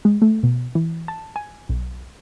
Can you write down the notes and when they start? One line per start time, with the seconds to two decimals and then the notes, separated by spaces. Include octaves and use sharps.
0.05 G#3
0.22 A3
0.43 B2
0.75 E3
1.08 A5
1.36 G#5
1.69 B1